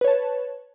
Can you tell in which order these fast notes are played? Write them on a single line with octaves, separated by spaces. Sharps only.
B4 C#5 A5